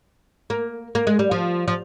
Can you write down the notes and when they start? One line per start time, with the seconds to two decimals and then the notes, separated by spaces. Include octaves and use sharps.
0.50 A#3
0.95 A#3
1.07 G#3
1.19 G3
1.31 F3
1.68 F3